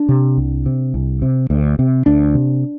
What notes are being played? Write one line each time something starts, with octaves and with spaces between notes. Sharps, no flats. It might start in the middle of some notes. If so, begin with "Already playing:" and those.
Already playing: D4
C3
C2
C3
C2
C3
D2
C3
D2 D4
C3